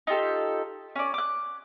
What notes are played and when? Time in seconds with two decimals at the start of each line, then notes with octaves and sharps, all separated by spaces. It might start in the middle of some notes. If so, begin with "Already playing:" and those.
0.07 D#4 F4 G4 A4
0.96 C#4 D5
1.14 D6 F#6